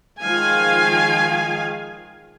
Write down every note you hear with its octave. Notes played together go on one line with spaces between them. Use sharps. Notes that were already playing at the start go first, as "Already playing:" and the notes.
D#3 F3 G#3 F5 G#5